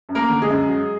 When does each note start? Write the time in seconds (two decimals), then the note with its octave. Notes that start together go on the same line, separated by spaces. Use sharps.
0.09 F#2
0.15 A#3 A#4
0.29 D3
0.42 G#3 G#4
0.49 F#2
0.69 F#3